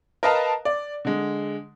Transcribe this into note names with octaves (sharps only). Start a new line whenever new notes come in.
A#4 B4 D#5 F5 A5 A#5
D5
D3 G#3